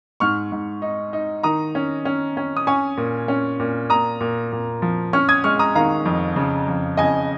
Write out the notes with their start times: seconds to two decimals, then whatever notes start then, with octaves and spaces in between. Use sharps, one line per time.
0.20 G#2 C#6 F6
0.52 G#2
0.82 D#4
1.13 D#4
1.43 D#3 A#5 D#6
1.75 C#4
2.05 C#4
2.37 C#4
2.57 D#6
2.67 C#4 G#5 C#6
2.97 A#2
3.28 C#4
3.59 A#2
3.90 A#2 A#5 D#6
4.20 A#2
4.52 A#2
4.82 F3
5.13 C#4 C#6 F6
5.29 D#6 G#6
5.44 G#3 C#6 F6
5.59 A#5 D#6
5.76 D#3 F5 A#5
6.05 F2
6.36 C#3
6.68 F2
6.97 C#3 D#5 G#5